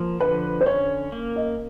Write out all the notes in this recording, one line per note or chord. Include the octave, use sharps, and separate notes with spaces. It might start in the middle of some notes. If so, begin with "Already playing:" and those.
Already playing: F3 A#3
D3 B4
C5
C#4 C#5
A#3
D#5